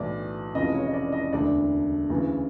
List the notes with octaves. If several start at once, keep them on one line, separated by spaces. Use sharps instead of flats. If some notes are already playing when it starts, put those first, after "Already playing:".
Already playing: B1 A2 E3 D5
F1 F2 C#3 E3 D#5
C#5
D#5
D5
D#5
E1 D2 D3 D5
D2 C#3 E3